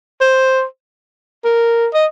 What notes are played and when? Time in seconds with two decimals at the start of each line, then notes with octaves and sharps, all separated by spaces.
0.21 C5
1.44 A#4
1.94 D#5